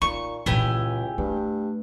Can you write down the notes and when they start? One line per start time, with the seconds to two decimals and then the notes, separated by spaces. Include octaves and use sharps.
0.02 A#2 D#4 C#6
0.46 C#2 A#2 E3 E4 G4 G#5
1.18 G2 A3